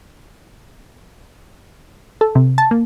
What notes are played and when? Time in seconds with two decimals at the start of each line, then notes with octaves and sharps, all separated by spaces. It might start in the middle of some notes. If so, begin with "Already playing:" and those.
2.21 A4
2.35 C3
2.58 A5
2.71 A#3